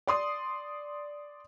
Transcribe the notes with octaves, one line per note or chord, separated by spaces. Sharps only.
D5 C6 D#6